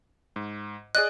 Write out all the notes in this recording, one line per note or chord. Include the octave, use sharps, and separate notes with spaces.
G#2
G#4 D5 D#5 F#6